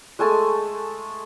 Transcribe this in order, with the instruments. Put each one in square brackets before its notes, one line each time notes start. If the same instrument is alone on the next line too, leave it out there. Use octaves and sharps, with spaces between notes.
[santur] G#3 A3 G#5 A5